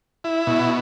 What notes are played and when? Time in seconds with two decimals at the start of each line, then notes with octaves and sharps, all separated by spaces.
0.24 E4
0.47 B2